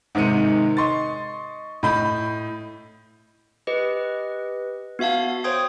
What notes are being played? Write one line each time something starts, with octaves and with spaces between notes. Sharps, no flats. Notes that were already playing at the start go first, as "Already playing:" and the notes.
G#2 C3 D#3 G#3 C#7 D#7
D#5 C6 C#6 A6
A2 D#5 B5 G6
G4 B4 D#5
B3 F#4 E5 F5 A5
C5 C#5 G5 C6 D#6 G#6